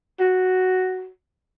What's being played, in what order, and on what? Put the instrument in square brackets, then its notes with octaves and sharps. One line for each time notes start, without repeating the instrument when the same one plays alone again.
[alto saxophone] F#4